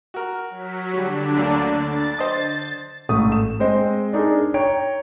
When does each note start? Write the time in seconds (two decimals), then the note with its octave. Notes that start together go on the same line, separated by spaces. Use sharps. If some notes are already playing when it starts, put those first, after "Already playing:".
0.14 F#4 A#4
0.50 F#3 B6
0.93 D3 F#3 G3 D4
1.37 D2 F#3 A#3
1.75 A6
2.19 C5 D#5
3.09 A1 G#2 A3 D#6
3.32 E7
3.60 G#3 C4 G#4 C5 D#5
4.13 D4 D#4 G#4 A#4
4.54 C#5 G5 A#5 D7